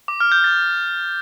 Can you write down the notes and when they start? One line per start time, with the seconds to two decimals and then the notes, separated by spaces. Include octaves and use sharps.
0.08 D6
0.20 F6
0.32 G6
0.44 A6